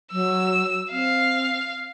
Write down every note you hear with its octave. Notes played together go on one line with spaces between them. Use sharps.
F#3 E6
C4 F5